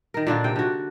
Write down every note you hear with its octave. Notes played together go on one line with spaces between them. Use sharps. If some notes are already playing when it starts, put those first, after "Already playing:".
D#3 A#4
A#2 D3 D4 F4
C3 G5
D3 F#4